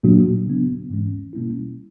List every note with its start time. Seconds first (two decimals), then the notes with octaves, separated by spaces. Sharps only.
0.03 A#2 F#3 A#3 D4 F#4
0.47 C#3 F#3 B3 D4
0.90 G#2 E3 G#3 C#4
1.33 B2 G3 A#3 C#4 E4